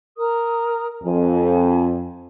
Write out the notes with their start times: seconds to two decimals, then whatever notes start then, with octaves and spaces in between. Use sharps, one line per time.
0.15 A#4 D#6
1.03 F2 G#5